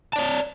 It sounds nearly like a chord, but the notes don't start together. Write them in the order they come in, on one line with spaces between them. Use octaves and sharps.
A5 D5 C#5